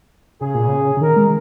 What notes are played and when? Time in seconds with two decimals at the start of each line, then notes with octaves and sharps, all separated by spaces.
0.41 C#3 G#4
0.55 A#2
0.68 C#3
0.97 C#3
1.01 D#3 A#4
1.16 G#3